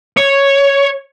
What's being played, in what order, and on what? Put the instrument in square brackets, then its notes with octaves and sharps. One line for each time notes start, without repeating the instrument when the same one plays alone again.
[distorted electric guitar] C#5